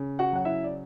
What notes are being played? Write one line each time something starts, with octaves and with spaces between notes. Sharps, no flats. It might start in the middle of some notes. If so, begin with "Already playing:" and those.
Already playing: C#3
F#4 F#5
F#3 F#5
E4 E5
D5